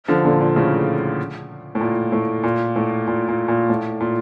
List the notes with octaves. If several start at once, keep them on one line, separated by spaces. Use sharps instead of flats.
D3 F3
A#2 D3
A#2
A2 C#3
A2
A#2
A2
A#2
A2
A#2
A#2
A#2
A2
A#2